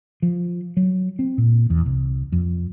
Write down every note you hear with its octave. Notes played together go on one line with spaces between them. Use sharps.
F3
F#3
C4
A#2
E2
C2
F2